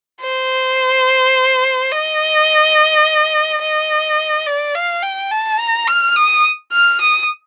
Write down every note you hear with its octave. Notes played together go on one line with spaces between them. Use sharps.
C5
D#5
D#5
D5
F5
G5
A5
A#5
F6
D#6
F6
D#6